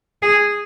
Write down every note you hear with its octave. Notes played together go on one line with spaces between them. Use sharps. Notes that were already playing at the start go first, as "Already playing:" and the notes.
G#4